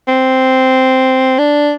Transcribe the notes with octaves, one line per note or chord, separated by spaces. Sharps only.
C4
D4